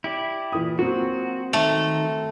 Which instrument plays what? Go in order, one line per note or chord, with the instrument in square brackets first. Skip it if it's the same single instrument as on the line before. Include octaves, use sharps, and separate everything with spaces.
[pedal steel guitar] E4 G4 D5
[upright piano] A#2 E3 D#6
[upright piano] F#3 A#3 C4 [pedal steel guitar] F#4
[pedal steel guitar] D#3 [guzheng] A3